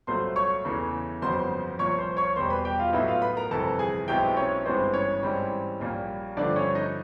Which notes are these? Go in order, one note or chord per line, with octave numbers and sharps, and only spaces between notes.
C2 A#2 F#3 A3 C5 C6
C#5 C#6
E2 C#3 E3 A3
G1 F2 C#3 F#3 B3 C5 C6
C2 A#2 F3 C#5 C#6
C5 C6
C#5 C#6
E1 E2 B2 G3 C5 C6
B4 B5
G4 G5
F4 F5
A2 F#3 B3 D#4 E4 E5
F4 F5
B4 B5
A#4 A#5
G1 F2 C3 E3 A4 A5
G#4 G#5
B1 B2 G#3 C4 E4 G4 G5
C#4 C#5
G#1 G2 E3 G#3 B3 C4 C5
C#4 C#5
G#2 E3 G3 C4
A#1 A#2 G3 A#3
G2 D3 F3 A3 D4 D5
C#4 C#5
D#4 D#5